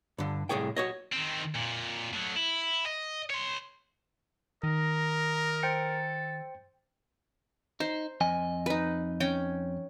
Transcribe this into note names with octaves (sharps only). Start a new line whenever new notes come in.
G2 D3
C2 A2 D#3 G#4 C#5 G5
F#4 C#5 D#5
D#3 C4
F2 A#2
A2 F#3
E4
D#5
C#5 C6
D#3 A#4 D#5
A4 C5 G5 C#7
D#4 C5
F2 D#5 G#5
D#4 B4
C#4 G5